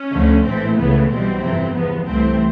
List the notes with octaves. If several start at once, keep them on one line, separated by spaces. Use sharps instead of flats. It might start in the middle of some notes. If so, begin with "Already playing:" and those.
Already playing: C#4
D2 D3 F3 A3
A#1 A2 E3 A3 C4
C#2 C#3 E3 A3 B3
B1 B2 G3 C4
G1 F2 C3 E3
E2 C3 F3 B3
C2 C3 E3 A3 C4